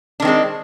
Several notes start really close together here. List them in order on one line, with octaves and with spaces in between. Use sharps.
D4 D#3 C4 G#3